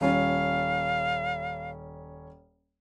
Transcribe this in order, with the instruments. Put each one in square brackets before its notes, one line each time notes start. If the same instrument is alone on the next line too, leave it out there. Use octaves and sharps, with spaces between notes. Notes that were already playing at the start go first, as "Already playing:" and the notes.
[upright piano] D#1 C#4 [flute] F5